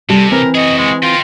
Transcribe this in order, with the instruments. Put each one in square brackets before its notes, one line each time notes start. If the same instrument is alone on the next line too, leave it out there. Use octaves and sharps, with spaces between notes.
[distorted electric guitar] C3 [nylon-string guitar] G3 A4
[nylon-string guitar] E3 C4 [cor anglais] A#4
[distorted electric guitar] F#4 G#4 [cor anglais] D#5
[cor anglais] G#3
[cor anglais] F4 [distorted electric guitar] D#5 G5